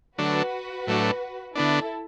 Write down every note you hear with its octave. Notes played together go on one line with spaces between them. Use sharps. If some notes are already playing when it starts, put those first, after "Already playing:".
D3 F#3 A3 D4 F#4 B4
A2 F#3 A3 D4
D3 B3 D4 E4 A4